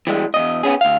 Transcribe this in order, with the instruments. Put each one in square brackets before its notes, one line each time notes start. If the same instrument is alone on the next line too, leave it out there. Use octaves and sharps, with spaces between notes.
[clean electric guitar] E3 G3 G#3
E2 G#2 D#5
B3 C#4 G#4
D2 F5